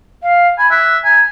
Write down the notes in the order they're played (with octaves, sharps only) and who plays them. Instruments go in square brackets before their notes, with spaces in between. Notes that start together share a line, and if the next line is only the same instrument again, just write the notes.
[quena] F5
[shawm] G#5 [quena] B5
[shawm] E5 [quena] F#6
[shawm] G#5 [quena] A#5